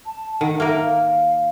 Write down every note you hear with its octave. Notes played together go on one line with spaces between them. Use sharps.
A5
D#3 F#5
A#3 A#4 E5
F5